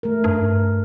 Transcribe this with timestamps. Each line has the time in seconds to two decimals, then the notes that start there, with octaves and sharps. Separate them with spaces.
0.03 A3 A#4
0.24 G2